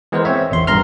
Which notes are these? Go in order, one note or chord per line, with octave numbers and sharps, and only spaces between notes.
E3 G#3 B3 G#4 A#4 C5
C4 C#5 E5
A1 E2 C6
A1 G2 A#5 C6 F6